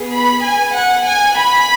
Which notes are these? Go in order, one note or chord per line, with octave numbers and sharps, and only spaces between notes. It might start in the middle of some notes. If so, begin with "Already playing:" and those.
Already playing: B3 G#4
B5
G#5
F#5
G#5
B5